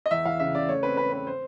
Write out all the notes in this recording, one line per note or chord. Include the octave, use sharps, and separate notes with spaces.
D#5
E2 E5
E2 F5
C#3 E5
C#3 D5
A3 C#5
C4 B4
C4 B4
C4 B4
C5